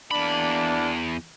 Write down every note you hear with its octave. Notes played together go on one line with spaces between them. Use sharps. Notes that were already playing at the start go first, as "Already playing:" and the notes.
E2 A#3 D4 B5